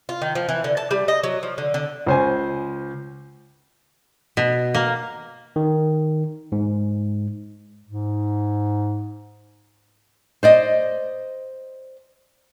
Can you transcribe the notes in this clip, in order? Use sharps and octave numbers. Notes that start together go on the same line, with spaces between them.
F4
D#3
F3
E3
D3
A5
G3
D#5
F#3
F3
D3
D3
C#2 C5 G#5
B2
A#3
D#3
G#2
G#2
C5 D5 D#5